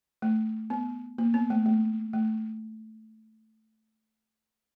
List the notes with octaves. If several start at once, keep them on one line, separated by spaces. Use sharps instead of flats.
A3
B3
A#3
B3
A3
A3
A3